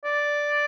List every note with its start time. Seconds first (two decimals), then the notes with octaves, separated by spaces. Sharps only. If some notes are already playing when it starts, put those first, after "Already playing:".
0.05 D5